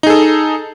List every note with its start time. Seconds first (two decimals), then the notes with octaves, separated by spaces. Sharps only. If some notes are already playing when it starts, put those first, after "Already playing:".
0.03 D#4
0.07 G#4
0.10 A4